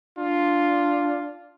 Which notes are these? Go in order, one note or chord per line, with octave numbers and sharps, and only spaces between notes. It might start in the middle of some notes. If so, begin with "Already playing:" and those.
D4 F4